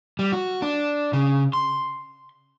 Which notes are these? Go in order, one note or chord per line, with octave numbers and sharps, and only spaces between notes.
G3
F#4
D4
C#3
C6